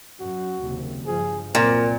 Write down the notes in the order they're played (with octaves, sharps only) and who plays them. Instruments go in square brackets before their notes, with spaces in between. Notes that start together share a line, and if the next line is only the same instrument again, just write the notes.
[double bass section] F#2 [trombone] F#4
[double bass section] F#1 D#2 C3
[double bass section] G2 F3 [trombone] G#4
[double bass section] C2 F#2 C4 [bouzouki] A#2 [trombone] A#4